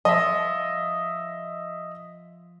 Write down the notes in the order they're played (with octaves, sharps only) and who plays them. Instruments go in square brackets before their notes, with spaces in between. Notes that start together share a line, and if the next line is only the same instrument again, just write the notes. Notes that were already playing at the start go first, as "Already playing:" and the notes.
[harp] F3 [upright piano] D#5 E5